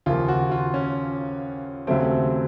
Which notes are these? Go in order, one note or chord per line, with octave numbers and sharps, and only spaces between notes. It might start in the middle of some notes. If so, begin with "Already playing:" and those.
D#2 C#3 F3 A#3 F4
F#4
F4
C#4
D#2 C#3 F#3 A3 C4